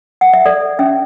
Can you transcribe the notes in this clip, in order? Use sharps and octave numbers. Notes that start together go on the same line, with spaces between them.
F#5
E5
A4 D5
C#4 E5